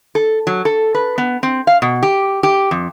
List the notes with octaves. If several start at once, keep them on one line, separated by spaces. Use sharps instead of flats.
A4
F#3
A4
B4
B3
C4
F5
B2
G4
G4
F2